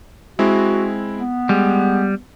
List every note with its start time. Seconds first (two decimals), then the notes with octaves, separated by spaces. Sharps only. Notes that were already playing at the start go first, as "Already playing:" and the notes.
0.39 G#3 C4 E4 F#4
1.17 B3
1.49 G3 G#3